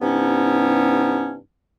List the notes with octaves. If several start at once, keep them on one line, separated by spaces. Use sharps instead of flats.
G2 C3 B3 C#4 D#4 E4